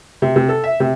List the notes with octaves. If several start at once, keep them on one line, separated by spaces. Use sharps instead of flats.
C3
C3
A4
E5
C3